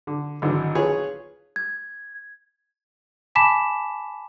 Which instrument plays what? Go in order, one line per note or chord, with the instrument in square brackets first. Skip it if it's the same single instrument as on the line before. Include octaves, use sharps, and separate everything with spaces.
[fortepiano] D3
G#1 D3 E3 F#3
F4 G#4 B4 C#5
[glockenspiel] G#6
[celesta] G#5 A5 B5 D6 B6 E7